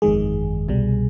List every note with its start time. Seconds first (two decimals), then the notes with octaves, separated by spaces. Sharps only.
0.02 G1 F2 D#3 G#3 G#4
0.68 C2 B2 G3